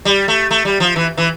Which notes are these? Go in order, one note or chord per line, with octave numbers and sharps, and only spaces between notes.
G3
A3
A3
G3
F3
E3
E3